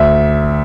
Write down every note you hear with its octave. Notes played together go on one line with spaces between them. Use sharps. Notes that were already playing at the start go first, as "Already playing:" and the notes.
Already playing: D2 E5